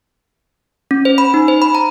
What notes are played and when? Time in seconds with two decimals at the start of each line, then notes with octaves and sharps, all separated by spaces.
0.91 C#4
1.05 C5
1.18 B5
1.34 D#4
1.48 C5
1.62 B5
1.75 A#5